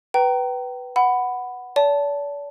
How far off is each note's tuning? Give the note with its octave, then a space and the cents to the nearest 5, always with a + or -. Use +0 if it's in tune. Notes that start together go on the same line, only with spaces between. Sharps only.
B4 +0 G5 -25 A#5 +0
F#5 +0 B5 +10
D5 -45 A5 +0